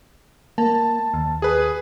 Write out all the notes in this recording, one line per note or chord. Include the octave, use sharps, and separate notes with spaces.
A#3 A5
D#2
G#4 B4